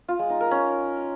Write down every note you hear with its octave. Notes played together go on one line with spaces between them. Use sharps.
F4
G#3
D#4
A#4
C#4